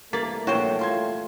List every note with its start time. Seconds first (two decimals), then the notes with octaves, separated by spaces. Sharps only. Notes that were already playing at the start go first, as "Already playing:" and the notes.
0.13 C2 E3 A3 A#3 D5 A#5 A6 B6
0.47 A#1 F#4 C5 C#5 E5 G5
0.79 F4 C6 G#6